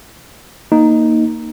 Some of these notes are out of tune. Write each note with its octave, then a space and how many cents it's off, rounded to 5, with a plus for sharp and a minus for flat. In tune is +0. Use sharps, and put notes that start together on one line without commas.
A#3 -5 D#4 +0